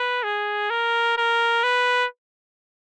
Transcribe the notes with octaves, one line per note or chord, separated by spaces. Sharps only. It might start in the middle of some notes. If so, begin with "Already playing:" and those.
Already playing: B4
G#4
A#4
A#4
B4